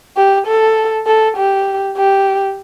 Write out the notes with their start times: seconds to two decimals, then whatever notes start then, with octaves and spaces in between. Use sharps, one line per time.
0.17 G4
0.47 A4
1.07 A4
1.37 G4
1.97 G4